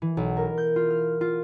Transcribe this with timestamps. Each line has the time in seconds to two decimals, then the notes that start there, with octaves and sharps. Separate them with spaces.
0.02 E3
0.17 B1
0.37 A#4
0.58 G6
0.76 F4
0.90 F6
1.21 F4